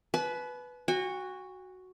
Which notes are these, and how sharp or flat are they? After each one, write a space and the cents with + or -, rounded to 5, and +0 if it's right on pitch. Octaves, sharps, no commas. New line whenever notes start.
B4 +0 A5 -45
F#4 +0 G#5 -45